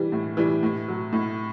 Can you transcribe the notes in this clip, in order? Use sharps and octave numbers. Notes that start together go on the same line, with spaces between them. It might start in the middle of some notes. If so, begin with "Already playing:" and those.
Already playing: E3 G3
A2
E3 G3
A2
F#3
A2